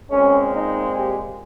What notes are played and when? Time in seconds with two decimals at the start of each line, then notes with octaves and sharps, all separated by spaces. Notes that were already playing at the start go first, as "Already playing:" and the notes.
0.10 A#2 G#3 C4 C#4
0.53 D#4
0.97 G4